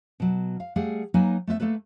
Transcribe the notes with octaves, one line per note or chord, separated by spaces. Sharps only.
B2 F#3
F5
G3 A3 G#4 F5 F#5
F#3 A#3 D#4 B4 G#5
A3 B3 E4 E5
A3 A#3 A4 B4